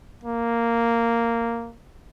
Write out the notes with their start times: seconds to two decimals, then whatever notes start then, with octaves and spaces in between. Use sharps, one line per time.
0.24 A#3